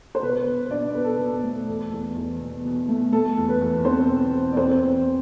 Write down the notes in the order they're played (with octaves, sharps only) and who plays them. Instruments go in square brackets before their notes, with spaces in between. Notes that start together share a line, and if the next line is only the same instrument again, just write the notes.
[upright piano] C5
B2 B4
B2
B2 D4 D5
B2 B4
A4
B4
B2
A3
E2 A4
E2
E2
B2
B2
A3
A3 A4
E2
B4
E2
E2 C4 C5
B2
E2
D5
E2 C4 C5
E2